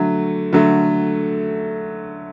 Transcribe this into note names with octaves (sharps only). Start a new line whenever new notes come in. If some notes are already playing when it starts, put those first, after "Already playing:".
Already playing: D3 F#3 A3
D3 F#3 A3